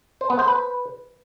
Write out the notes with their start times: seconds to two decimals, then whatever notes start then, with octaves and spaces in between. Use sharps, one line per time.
0.21 C5
0.30 B3
0.39 C5
0.48 B4